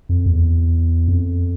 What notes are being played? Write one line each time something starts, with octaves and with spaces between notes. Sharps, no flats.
F2
E2
F2